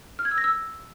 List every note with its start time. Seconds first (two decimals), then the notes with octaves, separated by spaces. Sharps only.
0.19 F6
0.25 G#6
0.31 E6
0.38 A#6
0.44 E6